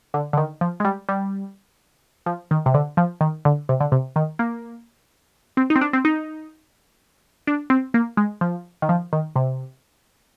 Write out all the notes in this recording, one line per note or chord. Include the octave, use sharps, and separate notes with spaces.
D3
D3
D#3
F3
G#3
G3
G3
F3
D#3
C3
D3
F3
D#3
D3
C3
D3
C3
D#3
A#3
C4
D#4
C4
D4
C4
D#4
D4
C4
A#3
G#3
F3
D#3
F3
D#3
C3